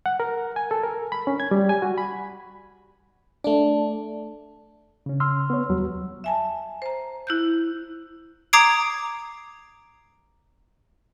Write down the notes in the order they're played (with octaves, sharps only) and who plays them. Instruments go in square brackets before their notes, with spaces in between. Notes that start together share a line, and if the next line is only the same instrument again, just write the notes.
[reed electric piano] F#5
A#4
G#5
A4
A#4
B5
C#4
G#6
G3
G#5
F#4
B5
[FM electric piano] A3 D4 [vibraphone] D5 A5
[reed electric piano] C#3 C#4
[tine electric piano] C6 E6 F6
[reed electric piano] B3 C#5
D#2 F#3 G3
[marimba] E5 G#5 A5
C5 A#5
E4 F#6 G6
[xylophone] A#5 D6 D#6 G#6 C7 D7